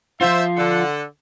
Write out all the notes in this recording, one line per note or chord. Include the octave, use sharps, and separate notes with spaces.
F3 F4 C5 E5
D3 A4 F#5